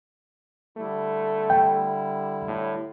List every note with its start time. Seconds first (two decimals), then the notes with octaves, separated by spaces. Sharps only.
0.78 D3 G3 A3 E4
1.50 G5
2.48 A2